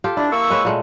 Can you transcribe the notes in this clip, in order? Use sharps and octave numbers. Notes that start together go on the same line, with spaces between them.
F4 G4 A4
D4 E4
A#3 C#6 E6
G#3 B4 C#5
A#2 G#3 A3